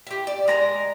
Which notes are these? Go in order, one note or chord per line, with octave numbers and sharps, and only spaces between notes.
E4 G4
D5
G#3 A#4 A#5